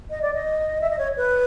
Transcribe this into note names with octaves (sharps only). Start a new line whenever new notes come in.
D#5
D5
D#5
E5
D#5
C#5
B4